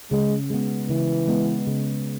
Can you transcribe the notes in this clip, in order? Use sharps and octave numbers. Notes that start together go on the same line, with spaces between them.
C#3 G#3
G#3 B3
C#3 E3
G#3 B3
C#3